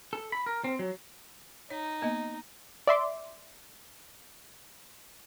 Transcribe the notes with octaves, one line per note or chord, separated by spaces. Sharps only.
A4
B5
A#4
C4
F#3
D#4 C#5
A#3 B3 D#5
D5 E5 C6 D6